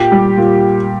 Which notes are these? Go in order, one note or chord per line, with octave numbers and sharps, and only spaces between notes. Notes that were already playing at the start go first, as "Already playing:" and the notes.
Already playing: A#2 G4
G3
A#2